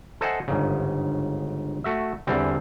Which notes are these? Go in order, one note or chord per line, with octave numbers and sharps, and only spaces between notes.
A4 C5 D#5 E5 F#5 G#5
G1 G#2 C#3
A3 F#4 E5
E2 D3 E3 G3 C4